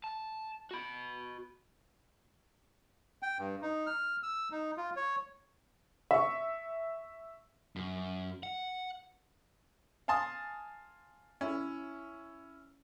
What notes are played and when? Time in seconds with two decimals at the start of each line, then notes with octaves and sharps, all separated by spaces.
0.04 A5
0.71 F#4 B5
3.23 G5
3.39 G2
3.62 D#4
3.87 F6
4.23 E6
4.51 D#4
4.77 F4
4.97 C#5
6.11 E5 C#6
7.76 F#2
8.43 F#5
10.08 F5 G#5 A5 C6 D#6
11.41 C#4 E4